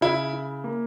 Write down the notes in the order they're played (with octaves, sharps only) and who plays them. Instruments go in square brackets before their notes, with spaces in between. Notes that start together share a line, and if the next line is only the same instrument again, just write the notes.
[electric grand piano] C#3 [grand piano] E4
[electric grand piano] E4
A#3